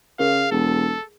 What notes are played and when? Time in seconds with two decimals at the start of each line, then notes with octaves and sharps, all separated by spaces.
0.19 C#3 G#4 A#4 F5
0.51 E1 A4